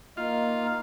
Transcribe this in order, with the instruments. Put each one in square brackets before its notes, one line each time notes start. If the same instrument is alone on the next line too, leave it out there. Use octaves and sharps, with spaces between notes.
[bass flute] A#3 [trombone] D#4 [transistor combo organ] F4